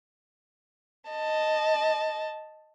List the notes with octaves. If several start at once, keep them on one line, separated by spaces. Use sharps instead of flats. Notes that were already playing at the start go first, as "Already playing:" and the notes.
D#5 A5